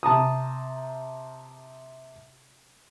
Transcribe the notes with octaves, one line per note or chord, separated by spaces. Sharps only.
C3 A5 A#5 D#6